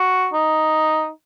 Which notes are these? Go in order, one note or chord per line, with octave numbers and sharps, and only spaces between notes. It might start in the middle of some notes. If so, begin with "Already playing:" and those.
Already playing: F#4
D#4